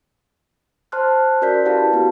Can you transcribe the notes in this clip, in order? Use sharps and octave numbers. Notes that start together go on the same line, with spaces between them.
C5 A5 C6 F6 F#6
C#4 F#4 A#4 D5 G6 B6
E4 G4 B4 F5 A5
B3 F#4